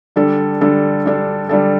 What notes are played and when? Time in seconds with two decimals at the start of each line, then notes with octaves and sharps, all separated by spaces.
0.16 D3 G3 D4 A4
0.61 D3 G3 D4 A4
1.05 D3 G3 D4 A4
1.49 D3 G3 D4 A4